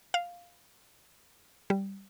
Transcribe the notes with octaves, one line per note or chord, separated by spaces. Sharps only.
F5
G3